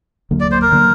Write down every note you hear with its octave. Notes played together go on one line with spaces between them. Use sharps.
D2 D3 F#3 A#3
D5
C5
A#4
D3 F#3 A#3